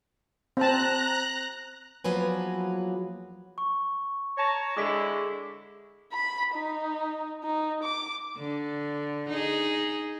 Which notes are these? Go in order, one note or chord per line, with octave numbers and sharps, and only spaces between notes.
C4 C5 A5 A#5 F#6
E2 F3 F#3 A#3 B4 G#5
C#6
C#5 A5 A#5
D3 G#3 E4 D6 B6
B5
D#4
D#4
D6
D3
D#4 G#4